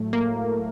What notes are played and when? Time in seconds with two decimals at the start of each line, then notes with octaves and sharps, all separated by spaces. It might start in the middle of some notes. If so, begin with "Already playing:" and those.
Already playing: A2 F#3 A3
0.13 A#3